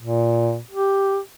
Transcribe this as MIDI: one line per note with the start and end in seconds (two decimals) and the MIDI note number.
0.01 0.58 46
0.71 1.18 67